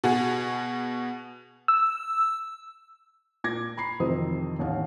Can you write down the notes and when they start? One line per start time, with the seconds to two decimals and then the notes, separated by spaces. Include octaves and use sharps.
0.04 B2 F#4 G#4
1.68 E6
3.44 A#2 D6 G#6 A#6
3.77 A#5 B5 C7
4.00 F2 C3 D#3 E3 C5 D#6
4.59 A1 D#2 F5